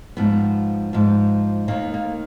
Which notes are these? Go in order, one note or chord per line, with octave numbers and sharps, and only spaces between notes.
G#2 F3 B3
G#2 F3
D#2 D#3 A#3
A#3